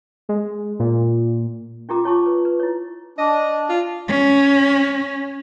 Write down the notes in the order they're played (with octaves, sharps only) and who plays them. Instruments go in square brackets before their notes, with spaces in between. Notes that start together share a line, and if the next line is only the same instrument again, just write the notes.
[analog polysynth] G#3
A#2
[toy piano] C#4 F4 G4 A#4 A#5 D6
F4 C#5 A5 C#6 D6
B4
B4
E4 C#5
[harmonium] D4 [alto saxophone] D#5
[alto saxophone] F4
[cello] C#4